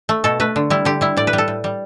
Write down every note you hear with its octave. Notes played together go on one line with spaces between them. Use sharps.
A3
B2 A4
A3 B4
D3
G3 E4
D3 G4
G3 E4
A2 D5
B4
G3
A4
A2
G3